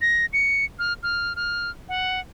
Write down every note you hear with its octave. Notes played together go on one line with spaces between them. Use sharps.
A#6
C#7
F6
F6
F6
F#5